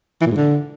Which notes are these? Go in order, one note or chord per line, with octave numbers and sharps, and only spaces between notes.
E3
A#2
G#2
D3